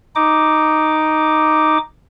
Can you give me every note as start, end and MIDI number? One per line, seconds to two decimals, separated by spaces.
0.16 1.78 63
0.16 1.78 86